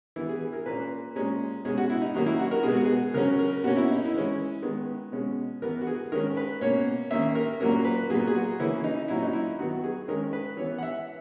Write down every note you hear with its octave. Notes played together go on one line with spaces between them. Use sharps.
E3 B3 E4
G#4
G#4
A#4
A#2 A#3 C#4 B4
A#2 G#3 C#4 G#4
B2 G#3 C#4 G#4
F#4
E4
D#4
D#3 F#3 A#3 C#4 D#4
E4
F#4
A#4
B2 G#3 B3 G#4
F#4
G#4
C#3 F#3 C#4 A#4
A#4
B2 A#3 C#4 F#4
E4
D#4
E4
E3 G#3 C#4
D#3 G#3 B3
B2 G#3 C#4
E3 B3 A#4
F#4
G#4
D#3 G#3 C#4 A#4
B4
B2 A#3 C#4 C#5
D#3 A#3 C#4 E5
A#4
A#2 F#3 A#3 C#4 A#4
B4
A#2 F#3 B3 G#4
G#4
F#4
C#3 E3 A#3 C#4 E4
D#4
A#2 F#3 C#4 E4
D#4
E4
D#3 F#3 B3 F#4
G#4
D#3 G#3 C#4 A#4
B4
E3 B3 C#5
F#5
E5